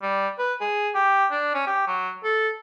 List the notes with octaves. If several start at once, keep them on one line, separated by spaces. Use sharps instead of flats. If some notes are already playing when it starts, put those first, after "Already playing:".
G3
B4
G#4
G4
D4
C#4
G4
F#3
A4